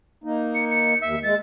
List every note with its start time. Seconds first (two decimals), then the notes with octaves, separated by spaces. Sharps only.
0.24 A#3 D#4
0.55 C#7
0.71 C#7
1.02 D#2 E5
1.23 G#3 A6